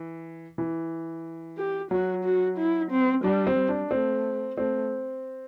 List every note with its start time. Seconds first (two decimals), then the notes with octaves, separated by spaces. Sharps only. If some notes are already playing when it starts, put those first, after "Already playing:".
Already playing: E3
0.58 E3
1.58 G4
1.91 F#3 F#4
2.25 F#4
2.58 E4
2.91 C4
3.24 G3 D4
3.47 C4
3.57 G3
3.69 D4
3.91 A3 C4
4.58 A3 C4